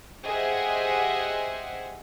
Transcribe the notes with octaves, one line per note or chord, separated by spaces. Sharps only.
G4 G#4 C5 D#5 E5 F#5